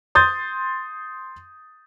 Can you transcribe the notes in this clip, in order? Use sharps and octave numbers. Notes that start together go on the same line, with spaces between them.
C6 D#6 G6 A6